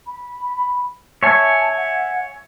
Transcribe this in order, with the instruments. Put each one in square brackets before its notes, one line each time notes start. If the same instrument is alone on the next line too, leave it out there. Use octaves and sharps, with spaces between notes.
[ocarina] B5
[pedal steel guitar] C#5 E5 G#5 [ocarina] A5
[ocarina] F#5